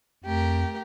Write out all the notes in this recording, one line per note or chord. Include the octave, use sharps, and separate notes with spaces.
F2 A3 G4 A#4